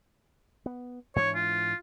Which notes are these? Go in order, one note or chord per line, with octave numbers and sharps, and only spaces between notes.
B3
G#2 E3 D4 C#5
F4